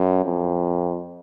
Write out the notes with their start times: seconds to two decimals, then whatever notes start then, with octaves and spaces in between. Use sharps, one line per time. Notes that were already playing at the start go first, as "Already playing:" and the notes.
Already playing: F#2
0.25 F2